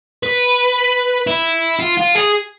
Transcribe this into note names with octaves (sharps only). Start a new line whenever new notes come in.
B4
E4
F4
F4
G#4